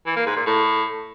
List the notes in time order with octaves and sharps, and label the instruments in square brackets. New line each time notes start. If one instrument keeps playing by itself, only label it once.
[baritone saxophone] E3
A#3
G#2
A#2
A2